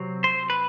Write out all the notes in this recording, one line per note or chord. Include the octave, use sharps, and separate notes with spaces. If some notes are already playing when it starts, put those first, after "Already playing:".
Already playing: C3 F#3 C4
C5
B4